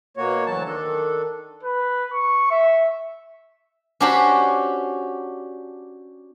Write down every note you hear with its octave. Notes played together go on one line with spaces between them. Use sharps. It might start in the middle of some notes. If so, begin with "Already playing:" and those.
B2 A#3 F#4 C#5
D2 E3 F#3 F#4 A5
D#3 D4 A4
B4
C#6
E5
C#4 D4 F#4 G4 C5 B5